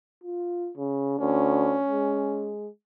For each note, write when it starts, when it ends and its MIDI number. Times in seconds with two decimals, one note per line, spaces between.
0.24 0.72 65
0.77 1.18 49
1.19 1.79 38
1.19 2.53 61
1.89 2.68 56